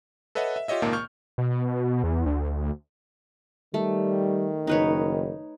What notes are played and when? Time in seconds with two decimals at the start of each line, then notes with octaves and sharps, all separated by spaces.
0.35 A4 B4 C#5 D#5 E5 F#5
0.56 E5
0.68 F4 G4 C#5 D#5 E5
0.82 G#1 C#2 A#2 D#3 A#3 A5
0.93 C#6 F6 G6
1.38 B2
2.04 E2
2.26 D2
3.74 D#3 G3 A3
4.67 F#1 D#4 B4 C#5